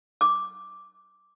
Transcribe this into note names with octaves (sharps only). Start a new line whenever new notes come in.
D6